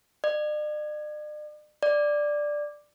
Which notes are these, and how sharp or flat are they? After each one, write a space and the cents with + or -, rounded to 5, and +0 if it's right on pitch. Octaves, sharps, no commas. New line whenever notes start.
D5 +45
D5 +5